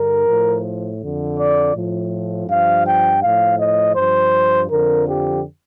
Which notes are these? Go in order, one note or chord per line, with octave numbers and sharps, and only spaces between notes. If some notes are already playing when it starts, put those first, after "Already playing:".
Already playing: G2 D3 A#4
A2 F3
F2 D3 F3
D5
A2 F3
G2 F3 F5
G5
A2 F3 F5
D#5
G2 F3 C5
F2 D3 F3 A#4
G4